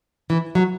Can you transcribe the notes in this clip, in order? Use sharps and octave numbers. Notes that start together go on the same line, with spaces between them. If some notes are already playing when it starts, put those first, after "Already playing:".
E3
F#3